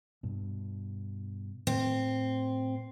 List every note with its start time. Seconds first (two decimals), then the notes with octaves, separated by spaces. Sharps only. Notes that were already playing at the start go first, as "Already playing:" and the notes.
0.23 G2 B2
1.67 A2 A3 C4